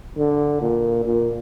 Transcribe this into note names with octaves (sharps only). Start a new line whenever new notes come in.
D3
A#2
A#2